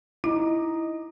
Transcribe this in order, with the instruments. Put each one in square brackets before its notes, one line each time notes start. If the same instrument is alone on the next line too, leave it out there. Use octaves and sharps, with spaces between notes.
[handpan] D#4 [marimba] E4